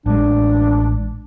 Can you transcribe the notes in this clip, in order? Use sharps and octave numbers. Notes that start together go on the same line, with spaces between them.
A1 G#3 D4